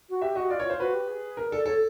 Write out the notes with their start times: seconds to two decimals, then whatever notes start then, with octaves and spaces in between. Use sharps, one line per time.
0.09 F#4
0.22 G4 E5
0.35 F#4 D#5
0.50 F4 D5
0.60 C#5
0.65 F4 C5
0.80 F#4 B4
0.94 G4
1.08 G#4
1.37 A#4
1.51 A4 D5
1.66 A4 C#5